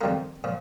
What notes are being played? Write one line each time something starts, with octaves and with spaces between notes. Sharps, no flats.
F2 D#3 G3 A#3 A#4
A#2 F3